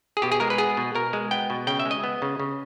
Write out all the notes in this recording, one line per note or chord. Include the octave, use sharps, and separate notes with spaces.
G#4
B2 G4
G#4
G#3 A#4
B4
B3 G#4
B2
B2 A#4
G#3
B3 G5
B2
C#3 G5
E5
G#3
D#5
B3
C#3
C#3